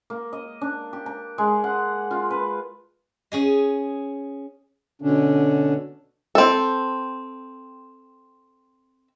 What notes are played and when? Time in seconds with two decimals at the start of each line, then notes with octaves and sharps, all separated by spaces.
0.10 A#3
0.33 D#5
0.61 D4
0.93 G4
1.06 A#5
1.38 G#3
1.64 F#5
2.11 F4
2.31 B4
3.32 C#4 G#4 D#5
5.02 B2 D3 C#4 D4
6.35 C4 A4